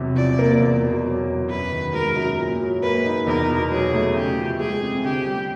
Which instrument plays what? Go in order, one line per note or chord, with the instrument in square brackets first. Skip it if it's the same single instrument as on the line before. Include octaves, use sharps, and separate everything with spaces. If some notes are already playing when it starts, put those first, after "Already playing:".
Already playing: [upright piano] E2 C3 F#3
[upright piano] F3 [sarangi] D5
[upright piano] A#3
E2
B2
F#3
E2
[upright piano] F#2 [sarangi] B4
[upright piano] D#3
[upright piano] G#3 [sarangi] A#4
[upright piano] F#2
A#2
F#3
[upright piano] A#3 [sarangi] B4
[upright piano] D#4
[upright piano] E2 [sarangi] A#4
[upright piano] B2
[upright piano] F#3 [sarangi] G#4
[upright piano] A3
[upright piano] C#3 [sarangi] G4
[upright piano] F3
[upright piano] G#3 [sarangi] G#4
[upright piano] C4
[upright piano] D3 [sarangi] G4
[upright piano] G3